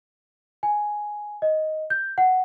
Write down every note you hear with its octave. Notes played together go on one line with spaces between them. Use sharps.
G#5
D#5
G6
F#5